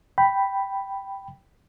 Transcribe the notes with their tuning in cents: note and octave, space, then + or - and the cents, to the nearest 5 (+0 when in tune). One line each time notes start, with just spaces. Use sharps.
G5 -5 B5 +0